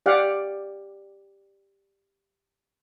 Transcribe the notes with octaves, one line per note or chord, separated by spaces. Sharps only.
G4 D5 F5 F#5